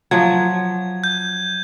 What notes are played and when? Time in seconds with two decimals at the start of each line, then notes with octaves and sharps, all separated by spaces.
0.11 F3 F#3 G#6
1.04 G6